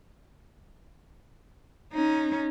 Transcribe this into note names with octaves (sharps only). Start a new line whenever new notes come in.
C#4 D#4